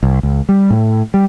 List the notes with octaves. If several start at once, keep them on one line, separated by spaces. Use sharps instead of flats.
C2
C#2
G3
A2
G3